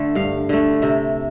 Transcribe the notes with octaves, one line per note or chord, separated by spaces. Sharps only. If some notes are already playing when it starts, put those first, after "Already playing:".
Already playing: D3 A3
G2 F5
D3 A3
C3 E5